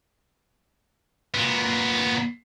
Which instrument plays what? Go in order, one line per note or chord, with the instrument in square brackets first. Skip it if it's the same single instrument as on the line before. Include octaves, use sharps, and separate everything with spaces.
[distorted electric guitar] A#2 B3